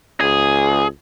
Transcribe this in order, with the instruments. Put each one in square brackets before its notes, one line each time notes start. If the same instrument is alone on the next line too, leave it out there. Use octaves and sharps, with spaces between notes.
[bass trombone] C#2 [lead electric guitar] G#4